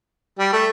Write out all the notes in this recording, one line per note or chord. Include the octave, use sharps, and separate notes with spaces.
G3
A3